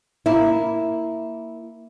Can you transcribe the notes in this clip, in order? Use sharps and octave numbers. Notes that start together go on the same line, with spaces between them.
A#3 E4